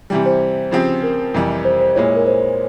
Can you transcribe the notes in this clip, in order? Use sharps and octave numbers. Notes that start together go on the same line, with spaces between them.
C3 E3 G3 G5
C5
C#3 F3 C4 G4
A#4
F2 C3 E3 G3
C5
C5
A#2 G#3 E4 C#5
C#5
A#4
C5